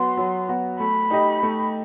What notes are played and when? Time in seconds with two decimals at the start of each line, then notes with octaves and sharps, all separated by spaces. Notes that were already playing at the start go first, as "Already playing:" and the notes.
Already playing: F#3 B3 F#4 C6
0.17 F#3
0.49 B3 F#4
0.80 A3 B5
1.10 D#4 G4 D#5
1.43 A3